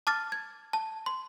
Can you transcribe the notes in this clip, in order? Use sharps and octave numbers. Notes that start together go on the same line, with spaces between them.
A5 D6 F6 A6
G#6
A5
C6